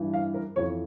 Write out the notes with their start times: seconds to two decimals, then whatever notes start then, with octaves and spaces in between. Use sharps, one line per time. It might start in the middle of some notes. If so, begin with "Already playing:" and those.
Already playing: G2 E3
0.14 F5
0.34 A#4
0.56 F2 E3 C#5